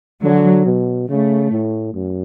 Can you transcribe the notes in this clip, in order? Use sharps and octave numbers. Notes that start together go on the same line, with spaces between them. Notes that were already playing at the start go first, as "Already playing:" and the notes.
D3 F#3
B2
C#3 A3
A2
F#2